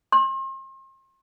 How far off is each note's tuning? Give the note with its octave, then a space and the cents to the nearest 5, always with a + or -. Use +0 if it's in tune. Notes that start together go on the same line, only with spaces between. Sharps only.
C6 +40